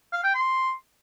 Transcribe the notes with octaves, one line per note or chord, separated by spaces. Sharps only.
F5
G5
C6